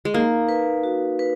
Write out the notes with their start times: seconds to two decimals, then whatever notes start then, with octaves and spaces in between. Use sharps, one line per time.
0.05 G#3
0.14 A#3 D#4
0.49 B4
0.84 F#4
1.19 B4